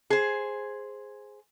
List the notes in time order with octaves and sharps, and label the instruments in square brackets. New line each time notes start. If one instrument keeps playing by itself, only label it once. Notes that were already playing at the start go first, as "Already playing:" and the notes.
[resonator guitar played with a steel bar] G#4 C5